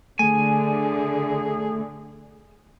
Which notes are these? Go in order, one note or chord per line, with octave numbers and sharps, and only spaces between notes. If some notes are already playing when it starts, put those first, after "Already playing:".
D3 A3 G#4 G#5